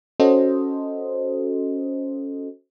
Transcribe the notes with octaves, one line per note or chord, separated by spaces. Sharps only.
C#4 F#4 A4 C5 D#5